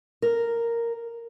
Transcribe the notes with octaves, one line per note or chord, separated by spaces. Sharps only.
A#4